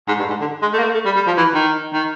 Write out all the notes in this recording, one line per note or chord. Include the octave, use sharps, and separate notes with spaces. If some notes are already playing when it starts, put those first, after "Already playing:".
G#2
G2
G#2
D3
G#3
A3
A#3
A3
A3
G3
G3
F3
E3
D#3
D#3